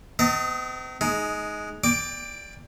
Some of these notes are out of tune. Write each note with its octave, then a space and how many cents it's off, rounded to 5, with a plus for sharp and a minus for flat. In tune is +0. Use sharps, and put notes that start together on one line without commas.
C4 -45 D#5 +5 A5 +40
G#3 +15 D#4 +0
D5 +0 G5 +25 D6 +0